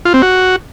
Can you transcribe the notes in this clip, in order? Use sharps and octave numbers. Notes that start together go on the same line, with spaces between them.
F4
C4
F#4